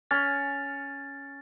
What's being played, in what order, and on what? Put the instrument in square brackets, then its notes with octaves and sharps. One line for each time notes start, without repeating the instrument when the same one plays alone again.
[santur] C#4 [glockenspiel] A6